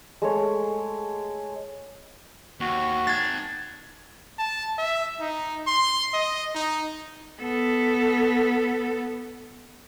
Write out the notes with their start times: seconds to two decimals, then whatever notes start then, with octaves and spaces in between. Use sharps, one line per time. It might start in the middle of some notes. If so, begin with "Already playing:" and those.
0.22 G#3 A3 C#5
2.60 D#2 F#4
3.07 D#4 A5 G#6 A6
4.39 A5
4.78 E5
5.21 D#4
5.67 C6
6.14 D#5
6.55 D#4
7.42 B3 A4